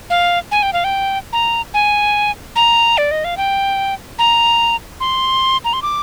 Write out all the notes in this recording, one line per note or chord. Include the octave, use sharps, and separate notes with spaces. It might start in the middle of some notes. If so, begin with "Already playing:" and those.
F5
G#5
G5
F5
G5
A#5
G#5
A#5
D5
D#5
F5
G5
A#5
C6
A#5
C6
D6